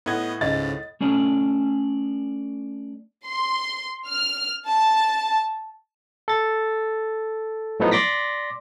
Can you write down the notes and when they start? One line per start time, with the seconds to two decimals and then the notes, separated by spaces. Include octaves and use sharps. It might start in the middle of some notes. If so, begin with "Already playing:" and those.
0.06 A2 B3 D#5 F#5 G#6
0.41 C#2 G#2 C#3 D#5 A6
1.01 A3 C#4 D4 D#5
3.27 C6
4.07 F6
4.68 A5
6.28 A4 A6
7.80 A2 F3 F#3 B3 D#4
7.91 D5 C6 D6 A#6 B6